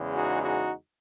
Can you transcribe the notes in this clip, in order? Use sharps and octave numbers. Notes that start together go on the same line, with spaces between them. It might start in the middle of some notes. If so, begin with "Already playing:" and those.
Already playing: E2 C#3 G#3
D#4 F#4
D#4 F#4